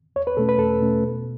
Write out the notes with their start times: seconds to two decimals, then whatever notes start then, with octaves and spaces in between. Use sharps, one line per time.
0.16 E2 C#5
0.27 B4
0.37 B2 A3 C#4 A4
0.49 B4
0.59 E2 A4
0.81 B2 A3 C#4
1.03 B2